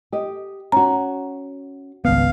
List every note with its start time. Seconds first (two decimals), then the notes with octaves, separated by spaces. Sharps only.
0.12 G4 D#5
0.72 C#4 F#4 A#5
2.05 G#1 C#2 G2 B3 F5